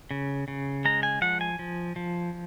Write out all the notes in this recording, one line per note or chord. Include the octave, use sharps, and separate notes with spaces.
C#3
C#3
G#3 A#5
G#5
F3 F#5
G#5
F3
F3